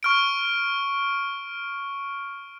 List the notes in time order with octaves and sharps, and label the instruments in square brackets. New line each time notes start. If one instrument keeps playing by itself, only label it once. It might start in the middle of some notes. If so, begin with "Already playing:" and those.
[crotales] C#6 F6 D7